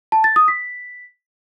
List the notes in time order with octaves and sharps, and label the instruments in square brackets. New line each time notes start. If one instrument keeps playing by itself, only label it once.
[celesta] A5
A6
D#6
B6